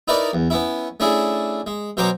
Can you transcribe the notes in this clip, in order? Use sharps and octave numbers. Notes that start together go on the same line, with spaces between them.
D#4 E4 A#4 B4 D5
E2
B3 C#4 E4
A3 C#4 D4 E4 G#4
G#3
B2 F#3 C#4 C5 A#5 D6